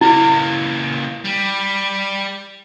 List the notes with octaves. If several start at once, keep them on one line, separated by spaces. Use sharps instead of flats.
C#2 A#3 E4
G3